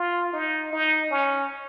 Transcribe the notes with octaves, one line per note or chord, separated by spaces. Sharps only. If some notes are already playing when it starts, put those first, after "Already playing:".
Already playing: F4
D#4
D#4
C#4